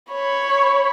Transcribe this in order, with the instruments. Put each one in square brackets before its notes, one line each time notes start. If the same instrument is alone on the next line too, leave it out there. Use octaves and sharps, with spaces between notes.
[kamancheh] C#5 B5